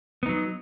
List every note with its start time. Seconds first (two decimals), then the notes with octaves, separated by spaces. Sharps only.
0.23 B3
0.26 D#4
0.29 F#3